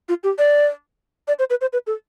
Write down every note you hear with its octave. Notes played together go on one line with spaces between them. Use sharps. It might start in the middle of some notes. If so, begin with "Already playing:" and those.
F4
G4
D5
D5
C5
B4
C5
B4
A4